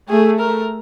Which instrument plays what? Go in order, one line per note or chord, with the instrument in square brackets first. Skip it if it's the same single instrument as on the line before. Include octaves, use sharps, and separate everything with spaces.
[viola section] A3 [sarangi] G#4
[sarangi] A#4